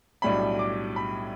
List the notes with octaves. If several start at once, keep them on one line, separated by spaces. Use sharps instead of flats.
B1 A2 G3 D4 B5
D6
B5